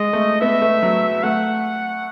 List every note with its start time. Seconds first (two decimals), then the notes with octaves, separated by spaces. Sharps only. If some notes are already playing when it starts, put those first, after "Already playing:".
Already playing: G#3 D#5
0.13 A3
0.41 B3 E5
0.62 A3
0.83 F#3
1.23 A3 F#5